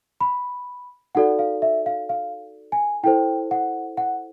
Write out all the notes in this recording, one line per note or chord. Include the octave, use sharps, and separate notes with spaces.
B5
D#4 F#4 A4 D5 F#5
F5
E5
F5
F5
G#5
E4 A4 C5 G5
F#5
F#5